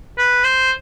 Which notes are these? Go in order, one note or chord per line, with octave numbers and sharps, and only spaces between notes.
B4
C5